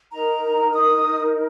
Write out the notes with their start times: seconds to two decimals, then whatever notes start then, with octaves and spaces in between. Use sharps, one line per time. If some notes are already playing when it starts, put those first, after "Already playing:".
0.11 D#4 A#4 A#5
0.73 D#6